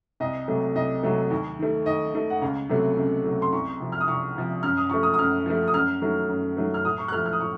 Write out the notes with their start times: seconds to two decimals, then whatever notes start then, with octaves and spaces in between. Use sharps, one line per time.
0.20 C2 D#5
0.48 C3 F#3 A3
0.75 C2 D#5
1.03 C3 F#3 A3
1.30 D#2
1.59 D#3 A3
1.86 D#2 D#5
2.14 D#3 A3
2.30 F#5
2.42 C#2 F5
2.69 C3 F#3 A3
2.97 C#2
3.24 C3 F#3 A3
3.42 C6
3.52 C2 C#6
3.80 C3 F3
3.92 F6
4.01 D#6
4.07 C2 C#6
4.36 C3 F3
4.63 F#2 F6
4.77 D#6
4.90 F3 A3 C#6
5.03 D#6
5.14 D#6
5.19 F#2 F6
5.46 F3 A3
5.68 D#6
5.74 F#2 F6
6.02 D#3 F#3 A3
6.29 F#2
6.57 D#3 F#3 A3
6.74 F6
6.85 A2 D#6
6.98 C#6
7.08 F#6
7.12 A3 F6
7.16 F3
7.26 F6
7.33 D#6
7.40 A2 C#6